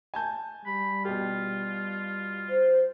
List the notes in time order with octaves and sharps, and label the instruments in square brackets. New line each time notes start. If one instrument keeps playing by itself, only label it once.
[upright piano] G#5 A5 G6
[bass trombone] G3 [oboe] B5
[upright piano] B2 G4 [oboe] F4
[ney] C5